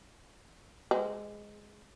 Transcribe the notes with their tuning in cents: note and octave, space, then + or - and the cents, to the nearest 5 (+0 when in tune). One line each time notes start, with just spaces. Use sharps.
G#3 +0 C5 -45